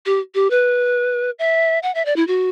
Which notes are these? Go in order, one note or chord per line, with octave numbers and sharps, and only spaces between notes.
G4
G4
B4
E5
F#5
E5
D5
E4
F#4